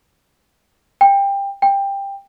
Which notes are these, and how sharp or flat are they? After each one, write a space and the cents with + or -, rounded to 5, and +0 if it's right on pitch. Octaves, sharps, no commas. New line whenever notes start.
G5 +20
G5 +15